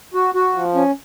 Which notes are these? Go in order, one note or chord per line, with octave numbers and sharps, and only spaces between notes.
F#4
F#4
F3
C#4